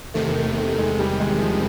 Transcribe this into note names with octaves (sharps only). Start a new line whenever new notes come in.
E2 C3 D#3 A3
A#3
A3
A3
G#3
G3
G#3
F3